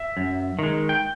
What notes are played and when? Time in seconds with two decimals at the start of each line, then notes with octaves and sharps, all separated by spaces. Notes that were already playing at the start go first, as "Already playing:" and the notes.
Already playing: E5
0.17 F#2
0.59 D#3 G#3
0.89 G5